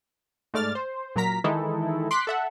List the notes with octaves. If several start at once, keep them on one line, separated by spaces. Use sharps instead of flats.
G#2 A3 D5 F6 A6
C5
A#2 F#3 A#4 A#5 B6
D#3 E3 G#3 D#4 E4 A4
C6 D6 F#6 B6
A4 E5 F#5